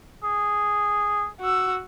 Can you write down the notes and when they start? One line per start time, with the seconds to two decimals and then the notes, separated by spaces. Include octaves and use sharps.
0.23 G#4
1.41 F#4 E6